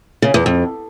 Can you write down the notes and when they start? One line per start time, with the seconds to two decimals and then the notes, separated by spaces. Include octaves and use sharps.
0.22 C#3
0.34 E2
0.46 F2